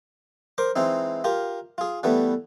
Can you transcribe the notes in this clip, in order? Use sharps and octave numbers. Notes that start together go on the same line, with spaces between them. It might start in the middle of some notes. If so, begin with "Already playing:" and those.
A#4 C5 D6
E3 G#3 C4 D#4
F4 G4 A#4
F4 G#4
E3 G3 A3 B3